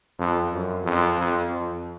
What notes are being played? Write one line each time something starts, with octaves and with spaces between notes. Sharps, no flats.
F2
F#2
F2
F2
F2